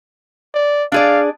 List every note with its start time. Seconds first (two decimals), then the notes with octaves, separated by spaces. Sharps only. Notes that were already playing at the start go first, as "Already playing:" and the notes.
0.54 D5
0.92 D4 G#4 D5 F5